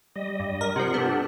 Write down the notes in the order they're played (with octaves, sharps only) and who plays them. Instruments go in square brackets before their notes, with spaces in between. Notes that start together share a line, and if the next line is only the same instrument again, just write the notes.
[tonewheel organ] G3 D#5
[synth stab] G2
A#4
[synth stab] C3 F3 [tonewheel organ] F#5
[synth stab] B3 [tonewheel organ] D4 G4 A4